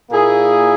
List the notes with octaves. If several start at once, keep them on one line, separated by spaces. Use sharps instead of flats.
A#2 A#3 E4 G#4